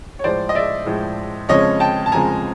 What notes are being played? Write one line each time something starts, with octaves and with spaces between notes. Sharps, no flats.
C#5
A2 F3 G#3 C5 D5
D#5
D5 E5
A2 F3 G#3
F2 C#3 F3 G#3 C#5 D#5
G5 A5
A5
F2 C#3 F3 G#3 G#5 A#5